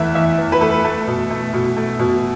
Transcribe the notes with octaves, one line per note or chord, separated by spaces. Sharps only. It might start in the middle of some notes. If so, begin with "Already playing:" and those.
Already playing: E2 E3 A3 E5
E2 E5
E2
B4
A3 A4
A3
B2
A3
B2
A3
B2